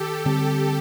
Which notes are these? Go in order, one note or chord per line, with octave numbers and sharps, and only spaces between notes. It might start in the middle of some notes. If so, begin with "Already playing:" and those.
Already playing: D#3 G4 A4
D3 G3 C4